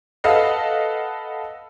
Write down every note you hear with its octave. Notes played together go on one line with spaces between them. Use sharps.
A4 B4 D#5 F5 F#5